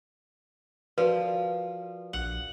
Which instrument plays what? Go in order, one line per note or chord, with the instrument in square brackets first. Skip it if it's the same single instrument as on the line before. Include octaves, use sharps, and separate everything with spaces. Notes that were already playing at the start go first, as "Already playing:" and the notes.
[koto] F3 [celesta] F#4 A#4 D5 [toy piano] B4
[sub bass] A#1 [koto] F#5